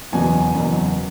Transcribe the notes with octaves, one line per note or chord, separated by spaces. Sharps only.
F#1 E2 B2 F#3 G#5
F#1 E2 B2 F#3